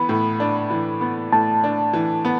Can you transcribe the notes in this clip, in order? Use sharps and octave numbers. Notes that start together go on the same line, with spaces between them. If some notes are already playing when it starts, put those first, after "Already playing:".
Already playing: E3 B3 B5
A2
D4
E3
B3
A2 A5
D4
E3
B3